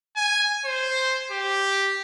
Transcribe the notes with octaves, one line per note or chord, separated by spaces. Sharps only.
G#5
C5
G4